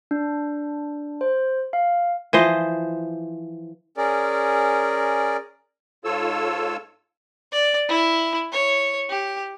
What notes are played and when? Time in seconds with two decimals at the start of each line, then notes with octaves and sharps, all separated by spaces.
0.11 D4
1.21 C5
1.73 F5
2.33 E3 F3 C5 D#5
3.97 C#4 G#4 A#4 D5
6.05 G#2 F4 A4 C#5 E6
7.52 D5
7.89 E4
8.52 C#5
9.10 G4